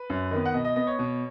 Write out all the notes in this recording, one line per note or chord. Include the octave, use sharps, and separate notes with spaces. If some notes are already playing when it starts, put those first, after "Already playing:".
Already playing: B4
F#2
D#3 B3
F#5
B2 D#5
D#5
B3 D#5
C#5
B2